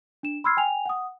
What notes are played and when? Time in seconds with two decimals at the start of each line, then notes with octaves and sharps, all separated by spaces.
0.23 D4 E7
0.44 B5 C6 E6 F6 G#6 C7
0.57 G5 G#5 F7
0.86 F#5 D#6